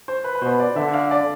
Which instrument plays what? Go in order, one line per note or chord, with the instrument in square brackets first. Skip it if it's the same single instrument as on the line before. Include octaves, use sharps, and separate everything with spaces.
[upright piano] C5
B4
B4
[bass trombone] B2 [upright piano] C5
[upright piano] D5
[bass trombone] D3 [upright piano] E5
[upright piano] F5
D5